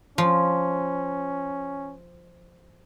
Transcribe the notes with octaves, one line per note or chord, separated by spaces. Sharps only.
F3 C#4